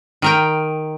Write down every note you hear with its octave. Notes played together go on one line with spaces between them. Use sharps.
D#3 A#4 G5